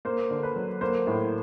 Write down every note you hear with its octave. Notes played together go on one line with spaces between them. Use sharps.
A#3 C5
D3
B4
F#3
A#3 C5
A2